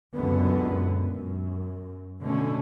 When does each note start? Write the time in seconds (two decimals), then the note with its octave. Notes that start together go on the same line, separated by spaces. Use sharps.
0.13 C#2 F#2 A#2 D3 B3
1.02 F#2
2.21 B2 D3 A3 C#4